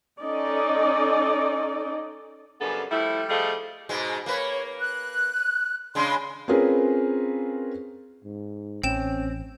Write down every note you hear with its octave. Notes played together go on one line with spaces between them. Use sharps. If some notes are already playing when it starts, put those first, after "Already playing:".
C#4 D#4 A4 D5 D#5
F#2 C#3 G3 B3 D4 A4
F3 G3 A3 E4
F3 G3 A3 G#4 D#5 F5
G#2 B2 G#3
A#3 B4 C#5
F#6
C#3 G#3 D4 C6
C4 C#4 F4 G#4 A#4 B4
G#2
A1 C4 C#4 G5 E7